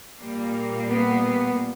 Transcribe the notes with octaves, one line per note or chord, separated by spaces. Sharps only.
A#2 G3 A#3
B3